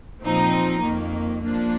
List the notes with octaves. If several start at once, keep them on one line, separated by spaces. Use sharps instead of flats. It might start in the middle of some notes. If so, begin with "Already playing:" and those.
A#2 F3 C4 D#4
F2 D#3 A#3
F3 A#3 D4